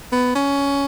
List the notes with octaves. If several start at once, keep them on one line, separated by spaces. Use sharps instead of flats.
B3
C#4